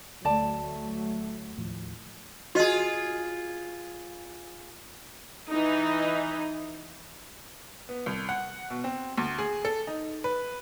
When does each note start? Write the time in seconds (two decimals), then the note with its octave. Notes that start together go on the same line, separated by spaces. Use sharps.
0.25 D2 F#3 A3 D5 A5
1.57 D#2 A2 F3
2.55 F4 F#4 G#4 D#5
5.51 E3 D#4
7.89 B3
8.06 C2
8.29 F#5
8.70 B2
8.84 C4
9.18 D2
9.39 G#4
9.65 A4
9.87 D#4
10.24 B4